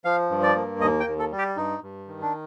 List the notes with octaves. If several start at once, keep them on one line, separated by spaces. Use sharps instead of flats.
F3 F5
G2
D5
A#3
D#2 D#5
G5
D#2
A4
G3
G4
G2 D#4
G2
D#3
D4